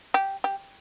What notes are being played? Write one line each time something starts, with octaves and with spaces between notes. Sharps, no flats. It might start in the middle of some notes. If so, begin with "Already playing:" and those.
G4
G4